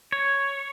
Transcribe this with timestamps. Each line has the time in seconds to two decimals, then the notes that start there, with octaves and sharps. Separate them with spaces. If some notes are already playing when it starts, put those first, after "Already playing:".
0.12 C#5